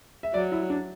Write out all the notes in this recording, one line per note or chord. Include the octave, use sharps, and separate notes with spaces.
E5
F#3 D5
E4
D4